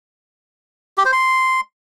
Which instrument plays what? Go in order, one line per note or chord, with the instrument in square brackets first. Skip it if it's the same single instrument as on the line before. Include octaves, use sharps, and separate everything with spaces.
[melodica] G4
C5
C6